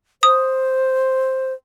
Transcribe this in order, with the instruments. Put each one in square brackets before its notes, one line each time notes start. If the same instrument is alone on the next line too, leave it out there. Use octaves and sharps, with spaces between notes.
[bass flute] C5 [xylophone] D#6